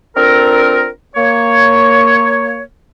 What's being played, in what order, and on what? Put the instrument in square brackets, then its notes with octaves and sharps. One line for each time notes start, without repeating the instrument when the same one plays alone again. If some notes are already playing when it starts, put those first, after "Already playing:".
[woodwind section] C4 D4 F4 A4 A#4
A#3 C#5